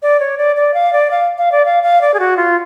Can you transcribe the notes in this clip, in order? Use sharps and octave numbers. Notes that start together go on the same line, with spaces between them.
D5
C#5
D5
D5
F5
D5
F5
F5
D5
F5
F5
D5
G#4
F#4
F4